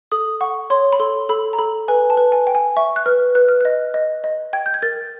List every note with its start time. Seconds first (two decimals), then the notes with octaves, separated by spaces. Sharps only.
0.12 A4 D#6
0.41 F#5 C#6
0.70 C#5 C6
0.93 B5
1.00 A4 C6
1.29 A4 B5
1.53 A#5
1.59 A4 B5
1.88 B4 G#5
2.10 A5
2.17 B4
2.32 G#5
2.47 G5
2.55 G#5
2.77 E5 C#6
2.96 F#6
3.06 B4 F6
3.35 B4 F#6
3.49 F6
3.61 D#5 F#6
3.94 D#5
4.24 D#5
4.53 G5 G#6
4.66 G6
4.74 G#6
4.82 A#4 A6